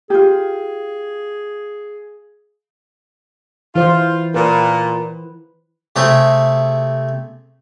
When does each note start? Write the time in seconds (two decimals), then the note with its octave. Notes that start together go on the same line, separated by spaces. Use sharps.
0.10 F4 G4 G#4
3.75 E3 F4 C5
4.34 A#2 B4
5.96 C3 A3 G#4